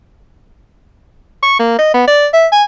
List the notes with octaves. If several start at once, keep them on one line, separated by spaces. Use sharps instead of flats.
C#6
A#3
D#5
B3
D5
E5
G#5